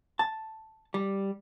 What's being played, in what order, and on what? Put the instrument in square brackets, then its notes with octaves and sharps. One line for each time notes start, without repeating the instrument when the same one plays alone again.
[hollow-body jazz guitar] A5
G3